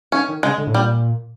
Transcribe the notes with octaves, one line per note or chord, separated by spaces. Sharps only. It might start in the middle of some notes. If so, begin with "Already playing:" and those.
D#3 C#4
D#3
C#3 G#3
D3
A2
A#2 G3